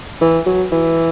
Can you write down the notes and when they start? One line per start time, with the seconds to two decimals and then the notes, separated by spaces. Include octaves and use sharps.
0.21 E3
0.46 F#3
0.72 E3